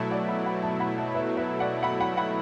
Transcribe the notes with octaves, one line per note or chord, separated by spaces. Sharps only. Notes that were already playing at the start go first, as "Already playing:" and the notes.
Already playing: B2 F#3 A3 E4 E5 A5
D5 F#5
F#5 B5
F#5 B5
E5 A5
F#5 B5
E5 A5
B4 E5
B4 E5
D5 F#5
F#5 B5
F#5 B5
F#5 B5